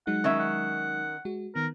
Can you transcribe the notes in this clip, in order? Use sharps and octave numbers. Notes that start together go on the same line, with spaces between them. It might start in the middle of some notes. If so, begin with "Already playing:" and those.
F#3 G#3 D#4 F#5
D#3 C#4 E5
F#5
G#3 F#4
D#3 B3 A#4